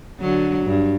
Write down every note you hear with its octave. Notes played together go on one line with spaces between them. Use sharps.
D3 F#3
G2